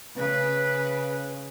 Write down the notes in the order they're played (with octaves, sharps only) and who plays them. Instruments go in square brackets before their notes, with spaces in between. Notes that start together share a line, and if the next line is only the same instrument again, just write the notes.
[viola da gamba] C#3 [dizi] B4